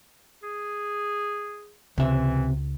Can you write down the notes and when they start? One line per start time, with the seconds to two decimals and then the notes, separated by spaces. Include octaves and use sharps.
0.43 G#4
1.98 C#2 C3 E3 E5